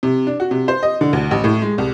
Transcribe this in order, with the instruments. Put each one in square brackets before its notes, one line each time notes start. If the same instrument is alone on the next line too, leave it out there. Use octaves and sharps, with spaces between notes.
[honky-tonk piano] C3
D4
F#4
C3
C5
D#5
D3
D2
A1
A2
G#3
C2